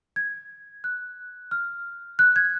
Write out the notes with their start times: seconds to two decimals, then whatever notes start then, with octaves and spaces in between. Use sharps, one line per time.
0.16 G#6
0.84 F#6
1.51 F6
2.19 F#6
2.36 G#6